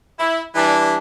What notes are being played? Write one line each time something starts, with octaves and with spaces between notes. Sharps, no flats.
E4
E3 G3 D4